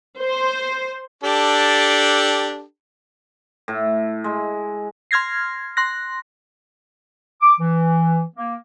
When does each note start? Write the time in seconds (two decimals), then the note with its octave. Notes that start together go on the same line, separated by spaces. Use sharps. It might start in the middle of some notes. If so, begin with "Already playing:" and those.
0.21 C5
1.24 D4 G4 A4
3.68 A2
4.24 G#3
5.11 C6 F6 G#6 A#6 C7
5.77 C6 F#6 A#6
7.41 D6
7.60 E3
8.36 A#3